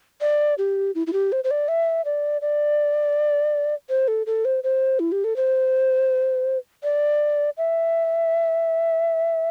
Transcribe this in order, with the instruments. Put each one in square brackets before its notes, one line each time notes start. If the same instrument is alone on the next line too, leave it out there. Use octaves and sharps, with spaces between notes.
[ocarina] D5
G4
E4
E4
G4
C5
C5
D5
E5
D5
D5
C5
A4
A4
C5
C5
E4
G4
A4
C5
D5
E5